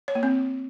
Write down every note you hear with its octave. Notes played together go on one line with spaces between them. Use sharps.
C#5
A#3
C4